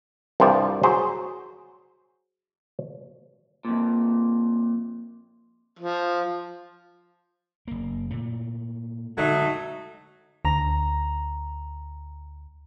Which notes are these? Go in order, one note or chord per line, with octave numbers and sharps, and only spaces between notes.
C2 G2 F3 C5 D5
F#3 G#4 C5
F2 A#2
F3
F#1 A#3
A#2 A3
D3 F#3 G#3 A3 D#4
D2 A#5